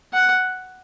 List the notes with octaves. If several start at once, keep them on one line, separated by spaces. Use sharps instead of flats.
F#5